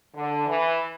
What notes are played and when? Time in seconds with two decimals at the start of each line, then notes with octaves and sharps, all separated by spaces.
0.15 D3
0.46 E3